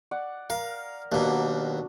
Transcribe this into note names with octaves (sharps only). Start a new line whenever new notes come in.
D5 F#5
A#4 F5
D#2 B2 F#3 D4